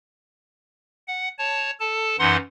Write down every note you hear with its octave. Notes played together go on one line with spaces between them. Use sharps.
F#5
C#5 A5
A4 A5
F#2 E3 D#4 F#5 C6